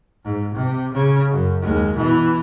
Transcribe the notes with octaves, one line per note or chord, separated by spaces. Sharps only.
G#2
C3
C#3
F#2
D#2 G#3
B2 E3